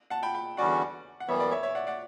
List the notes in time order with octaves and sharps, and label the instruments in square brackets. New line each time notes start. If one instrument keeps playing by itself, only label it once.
[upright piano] F#5 A5
G5 B5
G5 B5
[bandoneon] E2 D3 G3 C#4 F#4 [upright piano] D5 F#5
[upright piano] F#5
[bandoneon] F#2 E3 G3 B3 [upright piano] C#5 E5
[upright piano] D5
C#5 E5
C#5 E5
D5 F#5
D5 F#5